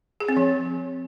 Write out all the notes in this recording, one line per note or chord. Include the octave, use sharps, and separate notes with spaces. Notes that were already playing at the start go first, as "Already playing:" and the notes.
G#4
C4
F3